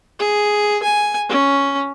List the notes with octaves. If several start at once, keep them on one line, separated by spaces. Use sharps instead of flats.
G#4
G#5
C#4